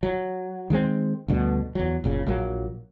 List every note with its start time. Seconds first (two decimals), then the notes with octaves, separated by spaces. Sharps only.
0.03 F#3
0.70 D#3 G#3 A3 C4
1.28 D2 G2 B2 D3
1.75 E2 F#3
2.04 F#1 A#2 C#3
2.26 A#1 A#2 F#3 A#3